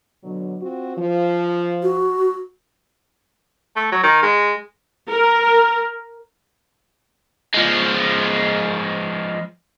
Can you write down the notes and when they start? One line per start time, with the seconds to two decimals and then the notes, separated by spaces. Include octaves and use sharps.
0.24 B2 D3 F#3
0.61 C4 F4 F#4
0.97 F3
1.83 F#4
3.76 A3
3.92 F#3
4.03 D#3
4.22 G#3
5.09 A#4
7.54 F3 G#3